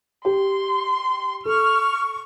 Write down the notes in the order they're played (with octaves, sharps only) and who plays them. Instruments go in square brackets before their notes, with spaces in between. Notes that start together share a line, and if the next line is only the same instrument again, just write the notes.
[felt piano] G4 [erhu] C6
[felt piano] A4 [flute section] C#6 [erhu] F6